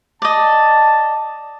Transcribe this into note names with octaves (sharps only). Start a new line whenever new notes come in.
D5 D#5 A5